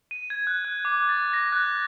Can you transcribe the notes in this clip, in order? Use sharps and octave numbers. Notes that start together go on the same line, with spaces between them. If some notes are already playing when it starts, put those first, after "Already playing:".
D#7
G#6
F#6
F#6
D6
A6
A#6
F#6